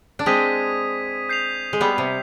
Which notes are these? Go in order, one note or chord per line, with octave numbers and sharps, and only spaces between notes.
D4
G#3 C4 D#6 G#6 B6 D#7
G6 C7 F7
G#3
G3 B3
C3